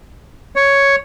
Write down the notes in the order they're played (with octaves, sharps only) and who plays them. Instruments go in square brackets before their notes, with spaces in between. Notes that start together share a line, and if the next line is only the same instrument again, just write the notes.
[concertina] C#5